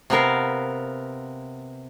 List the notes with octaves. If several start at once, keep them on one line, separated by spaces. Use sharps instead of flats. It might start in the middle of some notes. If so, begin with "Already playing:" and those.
C3 B3 A#4 F5